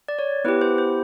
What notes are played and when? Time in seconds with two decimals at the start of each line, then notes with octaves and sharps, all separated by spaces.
0.08 D5
0.19 C#5
0.44 B3 E4 G4 B4
0.61 C5
0.78 C5